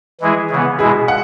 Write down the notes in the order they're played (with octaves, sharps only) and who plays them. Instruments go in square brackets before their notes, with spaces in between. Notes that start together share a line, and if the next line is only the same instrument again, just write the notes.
[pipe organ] E3 G#3 E4 G#4
C#3 E3 B3
[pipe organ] B2 G#3 E4 [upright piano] G#4
[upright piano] F#5